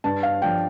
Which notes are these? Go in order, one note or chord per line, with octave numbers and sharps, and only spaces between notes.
G2 A5
F5
F3 D4 G5